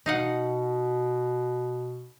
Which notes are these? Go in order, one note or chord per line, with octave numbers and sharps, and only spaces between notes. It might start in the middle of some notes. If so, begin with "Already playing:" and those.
B2 D#4 F5 F#5